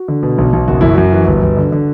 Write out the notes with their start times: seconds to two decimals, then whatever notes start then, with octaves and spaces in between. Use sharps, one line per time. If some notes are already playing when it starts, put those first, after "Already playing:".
Already playing: F#4
0.08 D3
0.23 B2
0.38 B1
0.53 B1
0.68 F#1 F#4
0.81 F#2 E4
0.94 F#2 F#4
1.13 E3
1.27 G1
1.43 G1
1.57 D3
1.72 D3